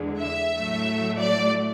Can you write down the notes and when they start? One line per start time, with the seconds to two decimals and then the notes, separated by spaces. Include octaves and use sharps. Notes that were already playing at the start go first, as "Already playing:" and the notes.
Already playing: E2 D3 G#3
0.20 E5
0.54 A2 F#3 A3
1.19 D5